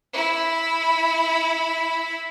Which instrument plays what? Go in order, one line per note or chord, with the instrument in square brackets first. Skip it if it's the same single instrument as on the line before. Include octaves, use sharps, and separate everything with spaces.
[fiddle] E4 B5